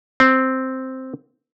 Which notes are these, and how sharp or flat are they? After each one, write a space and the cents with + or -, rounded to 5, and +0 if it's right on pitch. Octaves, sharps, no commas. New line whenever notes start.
C4 +0